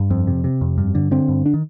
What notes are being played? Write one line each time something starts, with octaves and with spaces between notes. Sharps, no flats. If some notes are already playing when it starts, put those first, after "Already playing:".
Already playing: G2
F2 C4
C3
C3
F2
G2
D3
D3 C4
G2
D4
D#3